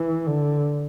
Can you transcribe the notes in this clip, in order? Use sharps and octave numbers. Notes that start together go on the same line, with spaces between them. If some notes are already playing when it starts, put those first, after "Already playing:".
Already playing: E3
D3